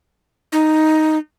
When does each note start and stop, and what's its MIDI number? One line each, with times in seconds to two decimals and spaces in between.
0.52 1.18 63